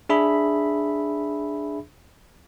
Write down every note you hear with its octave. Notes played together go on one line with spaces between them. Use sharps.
D4 G#4 E5 B5